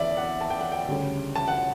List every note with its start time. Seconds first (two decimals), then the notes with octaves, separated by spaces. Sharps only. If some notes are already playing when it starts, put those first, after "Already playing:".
Already playing: E2 D5 E5
0.17 F#5
0.41 A5
0.50 G5
0.61 F#5
0.72 G5
0.88 D2 C#3 G3 C#4
1.36 A5
1.48 F#5